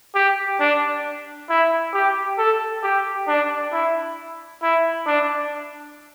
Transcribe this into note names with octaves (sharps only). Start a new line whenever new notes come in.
G4
D4
E4
G4
A4
G4
D4
E4
E4
D4